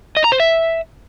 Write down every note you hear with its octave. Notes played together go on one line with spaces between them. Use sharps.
D#5
A#5
C5
E5